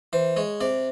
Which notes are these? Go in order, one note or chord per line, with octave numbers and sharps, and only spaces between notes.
E3 C5
G#3 C#5
C3 D5